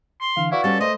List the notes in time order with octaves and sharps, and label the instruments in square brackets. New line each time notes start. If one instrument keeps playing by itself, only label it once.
[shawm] C6
[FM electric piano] D3 E3 [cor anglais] F5
[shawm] E4 [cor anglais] F#4 [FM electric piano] B4 D5 F5
[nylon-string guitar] G3 C#4 [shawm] A4
[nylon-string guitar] A3 [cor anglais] C5 [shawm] D#5